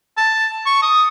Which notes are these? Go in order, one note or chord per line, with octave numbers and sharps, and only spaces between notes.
A5
C#6
D#6